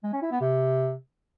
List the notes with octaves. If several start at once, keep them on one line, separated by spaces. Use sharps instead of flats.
G#3
C#4
E4
B3
C3